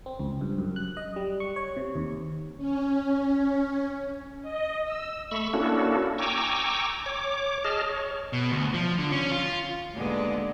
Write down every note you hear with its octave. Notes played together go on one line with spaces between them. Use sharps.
C4
C#2
G2
F#2
F#6
D#5
G3
C#6
C#5
C3
D#2
C#4
D#5
E6
A3 B5 C#6 E6
A#3 C#4 D4 E4 F#4 A4
G5 G#5 A#5 C#6 D6 E6
C#5 D6
G#4 D#5 A5 F6
C#5
B2
D2
F3
D3
C#4
F4
D#2 A#2 D3 G#3 B3 D4